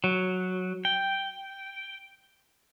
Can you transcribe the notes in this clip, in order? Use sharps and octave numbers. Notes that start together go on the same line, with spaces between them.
F#3
G5